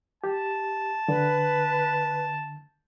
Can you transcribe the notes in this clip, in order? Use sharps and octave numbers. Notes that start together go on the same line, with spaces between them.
G4 A5
D3 B4